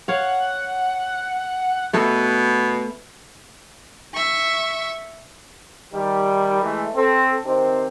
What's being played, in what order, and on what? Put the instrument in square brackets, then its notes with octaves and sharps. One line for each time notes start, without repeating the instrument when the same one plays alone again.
[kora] C#5 F5 [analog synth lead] F#5
[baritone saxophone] B2 [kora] A3 B3 A4
[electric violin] E5 C#6
[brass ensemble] D#3 G3
E3 G#3 A3
C4 A4
C3 D#3 C4